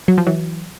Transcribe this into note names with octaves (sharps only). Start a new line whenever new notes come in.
F#3
F3
E3 F#3